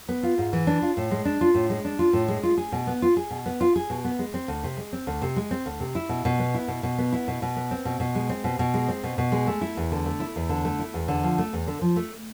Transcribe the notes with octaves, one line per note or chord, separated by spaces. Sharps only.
B3
F4
G#2
E3
D4
F4
A2
G#3
D4
F4
A2
G#3
D4
F4
A2
G#3
F4
G#4
B2
B3
F4
G#4
B2
B3
F4
G#4
B2
B3
G#3
C4
D2
C3
G#3
C4
D2
C3
G#3
C4
D2
C3
E4
B2
B2
B3
E4
B2
B2
B3
E4
B2
B2
B3
C4
B2
B2
G#3
C4
B2
B2
G#3
C4
B2
B2
G#3
A3
E4
E2
D3
A3
E4
E2
D3
A3
E4
E2
D3
F3
A3
E2
D3
F3
A3